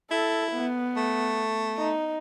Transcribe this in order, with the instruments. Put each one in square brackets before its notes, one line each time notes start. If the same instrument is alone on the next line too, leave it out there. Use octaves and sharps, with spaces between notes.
[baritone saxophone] E4 [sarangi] A4
[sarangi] B3
[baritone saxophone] A3
[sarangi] D#4